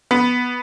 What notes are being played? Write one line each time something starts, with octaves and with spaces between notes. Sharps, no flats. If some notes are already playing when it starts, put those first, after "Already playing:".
B3